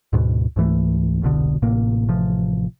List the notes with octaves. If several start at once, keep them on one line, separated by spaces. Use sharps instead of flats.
D2 G#2 B2
C#2 G#2 E3 A3
E1 C2 B2 D3
A1 A2 C3 A#3
A1 C3 F3